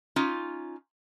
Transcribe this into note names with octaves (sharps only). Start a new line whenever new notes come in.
C#4 D#4 F4